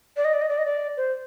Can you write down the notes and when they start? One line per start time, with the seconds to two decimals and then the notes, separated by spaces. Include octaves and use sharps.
0.17 D5
0.25 D#5
0.33 D5
0.42 D#5
0.49 D5
0.58 D#5
0.66 D5
0.97 C5